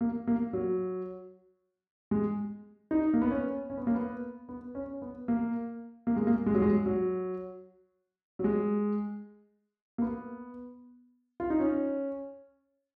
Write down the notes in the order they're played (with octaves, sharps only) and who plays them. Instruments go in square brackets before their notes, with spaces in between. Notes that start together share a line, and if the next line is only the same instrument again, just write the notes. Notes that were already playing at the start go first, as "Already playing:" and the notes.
[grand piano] A#3
A#3
F#3
G#3
D#4
A#3
B3
C#4
C#4
B3
A#3
B3
B3
C#4
B3
A#3
A#3
G#3
A#3
G#3
F#3
G#3
F#3
F#3
G#3
A#3
B3
F4
D#4
C#4